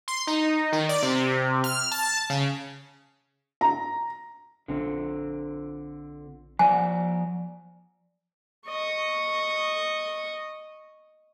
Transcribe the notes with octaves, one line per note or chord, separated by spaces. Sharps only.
C6
D#4
D#3
D5
C3
F6
A5
C#3
A#5
A#1 D3 C4
F3 D5 F#5 G#5
D#5 C#6